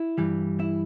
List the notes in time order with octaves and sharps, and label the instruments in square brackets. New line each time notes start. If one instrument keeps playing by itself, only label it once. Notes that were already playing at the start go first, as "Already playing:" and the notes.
Already playing: [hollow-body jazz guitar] E4
G2 E3 G3
E4